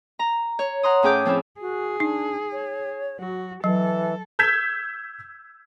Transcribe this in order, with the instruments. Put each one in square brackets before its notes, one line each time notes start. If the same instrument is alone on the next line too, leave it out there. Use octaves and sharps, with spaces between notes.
[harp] A#5
C#5
F#5 A#5 C6 D#6
A2 C#4 G#4 G5 D6 G6
F3 C4 C#4 E4
[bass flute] F#4 [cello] G#4
[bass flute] D4 [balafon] D#4
[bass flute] C#5
[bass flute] F#3 [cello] F#4
[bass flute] E3 [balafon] F#3 [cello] A4
[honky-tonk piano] E6 G6 G#6 B6 E7